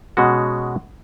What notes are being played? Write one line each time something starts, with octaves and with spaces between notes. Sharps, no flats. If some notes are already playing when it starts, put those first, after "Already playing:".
B2 G#3 C#4 F#4